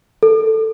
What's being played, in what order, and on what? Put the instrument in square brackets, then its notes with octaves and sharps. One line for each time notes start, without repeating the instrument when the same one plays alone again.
[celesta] A4